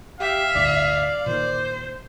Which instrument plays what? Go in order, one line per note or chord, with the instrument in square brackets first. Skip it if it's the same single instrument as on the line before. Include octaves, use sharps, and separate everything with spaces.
[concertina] G4 [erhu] E5 [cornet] F5
[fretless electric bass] G1 D2 A2 [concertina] D5
[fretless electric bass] A#2 D#3 [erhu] C5